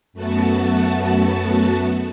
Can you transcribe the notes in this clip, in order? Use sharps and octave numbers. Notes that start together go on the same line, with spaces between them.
F#2 A3 B3 F#4 A5